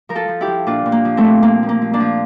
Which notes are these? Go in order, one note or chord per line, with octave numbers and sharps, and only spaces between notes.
F3 A#4
F4 A4
F3
E4 G4
F3
A#2 D4 F4
A#2
A#3
F3
A3 C4
A#2
F3 A#3
F3
A#3
F3
A#3 D4
F3